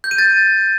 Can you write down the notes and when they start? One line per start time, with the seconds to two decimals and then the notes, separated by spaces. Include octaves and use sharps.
0.04 G6
0.11 D#7
0.18 A6